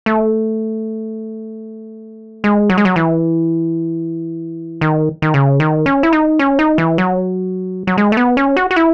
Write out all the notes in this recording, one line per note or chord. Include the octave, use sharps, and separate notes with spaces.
A3
G#3
F#3
G#3
F#3
E3
D#3
D#3
C#3
D#3
C#4
E4
D#4
C#4
D#4
E3
F#3
F#3
G#3
A3
B3
C#4
F#4
F#4
E4